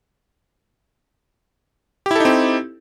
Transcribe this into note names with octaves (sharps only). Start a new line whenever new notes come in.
C4 D#4 E4 G4 A4